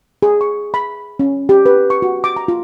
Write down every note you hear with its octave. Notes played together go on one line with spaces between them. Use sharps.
G#4
C#6
B5
C#4
G4
B4
C#6
F#4
D6
A#5
F4